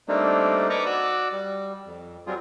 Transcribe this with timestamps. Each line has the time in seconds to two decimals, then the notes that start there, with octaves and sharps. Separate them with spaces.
0.08 G3 A3 A#3 C4 D4 D#4
0.70 B4 D5 D#5 A#5 C#6 D6
0.86 F#4 D5 D6 E6 F#6
1.32 G3
1.86 F2
2.27 F#3 G3 C4 F4 G#4